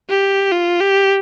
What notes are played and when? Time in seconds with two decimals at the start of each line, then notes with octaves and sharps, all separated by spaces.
0.10 G4
0.52 F4
0.81 G4